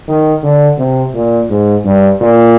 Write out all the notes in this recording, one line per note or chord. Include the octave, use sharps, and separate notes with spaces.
D#3
D3
C3
A#2
G#2
G2
A#2